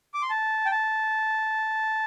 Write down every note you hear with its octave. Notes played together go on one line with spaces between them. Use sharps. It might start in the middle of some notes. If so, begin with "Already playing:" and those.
D6
C6
A5
G5
A5